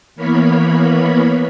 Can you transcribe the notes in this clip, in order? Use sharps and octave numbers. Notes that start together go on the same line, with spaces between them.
E3 A#3 B3 A#4 C#5 B5